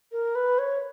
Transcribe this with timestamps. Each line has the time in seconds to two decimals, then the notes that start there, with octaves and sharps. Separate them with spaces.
0.12 A#4
0.35 B4
0.59 C#5